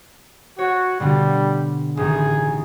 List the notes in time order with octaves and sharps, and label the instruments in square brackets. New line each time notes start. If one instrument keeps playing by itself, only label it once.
[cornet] F#4 [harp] C#5
[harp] B2 D3 [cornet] G3
[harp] A1 A2 D#3 [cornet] G#4